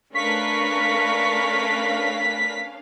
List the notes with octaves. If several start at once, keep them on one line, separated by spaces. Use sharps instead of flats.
A3 C#4 D4 A#4 B4 F5 C#6 B6